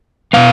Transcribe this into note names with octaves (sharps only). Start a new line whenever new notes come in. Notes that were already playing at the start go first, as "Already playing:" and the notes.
B2 G#3 B3 F5